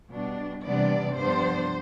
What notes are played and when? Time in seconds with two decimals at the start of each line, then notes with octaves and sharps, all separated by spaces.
0.11 B2 G3 D4
0.63 C3 E3 G3 B3 D4 D5
1.16 G2 F3 B3 D4 C5